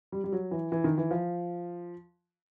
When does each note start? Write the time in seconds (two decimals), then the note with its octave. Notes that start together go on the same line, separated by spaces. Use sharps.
0.12 G3
0.24 G3
0.32 F#3
0.51 E3
0.72 E3
0.84 D#3
0.98 E3
1.11 F3